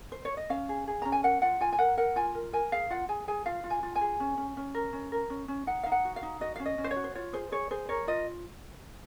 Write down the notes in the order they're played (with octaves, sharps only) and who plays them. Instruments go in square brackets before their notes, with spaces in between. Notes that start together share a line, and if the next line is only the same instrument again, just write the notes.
[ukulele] C5
C#5
D#5
C#4 F5
G#4
G#4
C#4 A#5
G#5
A#4 F#5
F4 F#5
F4 G#5
G#5
A#4 F#5
A#4 F#5
F4 G#5
A#4
A#4 G#5
G#4 F5
F4 F#5
G#4 G#5
G#4 G#5
F4 F5
F4
G#5
F4
G#5
G#4
C#4
C#4
C#4
A#4
C#4
A#4
C#4
C#4
D#4 F#5
D#4 F5
F#5
F#4
F5
D#4
F#4 D#5
C#4 F5
D#5
C#4
C5
C#5
F#4
C5
F4 C#5
G#4 C5
G#4 C#5
G#4 C5
A#4 C#5
F4 D#5